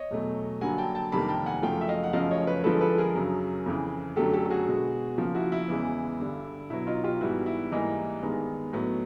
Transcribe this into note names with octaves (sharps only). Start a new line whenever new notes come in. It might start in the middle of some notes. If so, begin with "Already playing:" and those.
Already playing: C#5 D#5
E2 B2 F#3 A3
G2 D3 F#3 A#3 F#5 G#5
G5 A5
G5 A5
F2 C3 D#3 G3 A#3 A5 B5
G5 A5
F#5 G#5
F#2 C#3 F3 A3 F5 G5
E5
D#5 F5
F#5
F#2 C#3 F3 A3 D#5 F5
C#5 D#5
B4 C#5
G2 D3 F3 G#3 A4 B4
A4 B4
G#4 A#4
F#2 C#3 F#3
F2 C#3 E3
F#2 D3 F#3 A3 G4 A4
G4 A4
G4
F#4 G#4
B2 G#3 B3
C#3 F3 A#3
E4 F#4
E4
E2 C#3 E3 G#3 B3
G2 D3 G3
B2 F#3 B3 E4
D#4 F4
F4 G4
G#2 E3 G3 B3 E4 F#4
E4
G#2 E3 G3 A#3 D#4
G2 D#3 G#3 B3
A2 F#3 B3